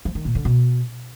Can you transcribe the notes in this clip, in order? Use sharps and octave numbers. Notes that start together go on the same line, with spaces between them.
F3
D#3
A#2
D3
B2